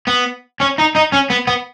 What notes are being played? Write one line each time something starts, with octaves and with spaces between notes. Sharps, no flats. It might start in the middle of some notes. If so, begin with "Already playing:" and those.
B3
C#4
D#4
D#4
C#4
B3
B3